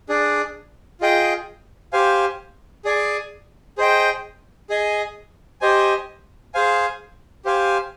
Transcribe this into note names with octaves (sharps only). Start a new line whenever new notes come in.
D4 G#4 D5
F4 G#4 D#5 G5
G4 C5 F5 G#5
G#4 D5 G#5
G#4 C5 D#5 G5
G#4 D#5 G#5
G4 C5 D#5 G#5
G#4 C5 F5 G#5
G4 C5 F5 G#5